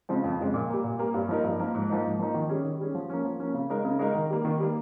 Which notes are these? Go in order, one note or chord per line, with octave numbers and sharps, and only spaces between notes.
C#3 F3 G#3 C4
F2
C#3 F3 G#3 C4
A#2
G3 A#3
A#2
G3 A#3
G2
F3 A#3 D#4 A#4
G2
F3 A#3 D#4 A#4
G#2
F3 A#3 D#4
G#2
F3 A#3 D#4
D#3
G3 C#4 G#4
D#3
G3 C#4 G#4
F3
A#3 C#4
F3
A#3 C#4
C#3
G#3 D#4 A#4
C#3
G#3 D#4 A#4
D#3
G3 A#3
D#3
G3 A#3